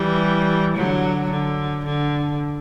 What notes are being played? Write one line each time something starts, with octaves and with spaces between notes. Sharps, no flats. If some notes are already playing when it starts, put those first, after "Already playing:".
Already playing: E3 G3
D3 F#3
D3
D3